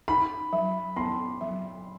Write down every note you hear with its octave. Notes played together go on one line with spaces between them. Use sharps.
D#4 B5
F#3
B3 C6
F#3